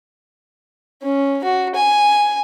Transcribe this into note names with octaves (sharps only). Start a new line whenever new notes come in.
C#4
F#4
G#5